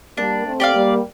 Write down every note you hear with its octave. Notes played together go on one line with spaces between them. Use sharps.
G3 A#3 D4
A3 C4
G4 D5 F5
G3 A#3